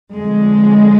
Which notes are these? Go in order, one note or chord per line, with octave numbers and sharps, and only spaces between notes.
F2 D3 G#3